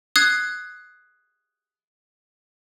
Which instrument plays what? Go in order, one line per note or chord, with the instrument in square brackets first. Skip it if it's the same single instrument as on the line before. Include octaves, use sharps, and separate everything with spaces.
[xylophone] D#6 F#6 G#6 C7